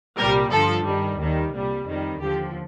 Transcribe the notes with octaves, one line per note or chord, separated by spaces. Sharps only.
C2 A#2 G3 A#4
G2 D3 F3 A4
G2 D#3 G3
D#2 D#3 G3
C2 A#2 G3
F2 D#3 G3
D#2 D3 F3 G4